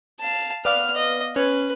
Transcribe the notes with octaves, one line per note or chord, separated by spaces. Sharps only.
F5 A5
B3 D5 F5 F6
D#5
C#4 B4